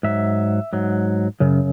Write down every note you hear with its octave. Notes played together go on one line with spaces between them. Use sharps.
G#2 F#3 E5
G#2 F#3
F#2 C#3